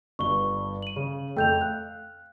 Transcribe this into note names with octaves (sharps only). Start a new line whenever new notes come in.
G1 G2 C#6 G7
D#7 F#7
C#3 G#4
F2 A3 G5 G6 F7
F5 F#6